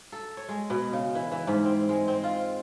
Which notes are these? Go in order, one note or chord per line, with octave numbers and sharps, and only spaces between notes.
A4
C#5
G#3
B2
C#3
E3
E3
G#2
C4
G#3
C4
F4